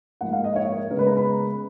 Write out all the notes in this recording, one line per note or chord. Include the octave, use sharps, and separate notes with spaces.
G#2 F3 A#3 F#5
F5
D#5
C#5
A#4
C#3 G#3 B3 A#4
B4
A#5
B5